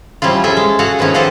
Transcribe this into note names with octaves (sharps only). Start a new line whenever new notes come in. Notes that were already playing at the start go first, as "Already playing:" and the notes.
F3 G3 C#4 E4 F4
C#4 G#4 A4 E5
G#3
F#4 G#4 A4 D#5 F5 F#5
D#3 F3 B3 C#4 E4
G4 A4 C5 D#5 F5 F#5